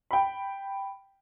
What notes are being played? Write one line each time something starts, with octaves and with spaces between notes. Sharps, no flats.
G5 B5